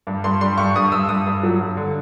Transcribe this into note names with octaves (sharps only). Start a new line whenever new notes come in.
G2
G2 C6
G3 C6
G2 C#6
G2 D#6
G2 E6
G2 D#6
G2
F#3
G2
D3